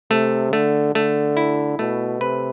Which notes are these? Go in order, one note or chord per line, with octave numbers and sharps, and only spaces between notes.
C3 A3
D3 A3
D3 A3
E4
B2 A3
C3 B4